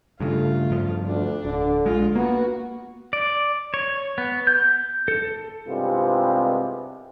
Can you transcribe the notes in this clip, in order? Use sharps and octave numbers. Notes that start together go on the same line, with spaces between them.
G2 C#3 A3 F4
G2 F3
D2 D4
D1 D3
A#1 G#3 F4
A#3 B3 F#4
D5
C#5
B3
G6
A4
C2 G2 C3 G#3 B3 F4